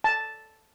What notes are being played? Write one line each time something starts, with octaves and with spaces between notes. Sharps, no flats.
A5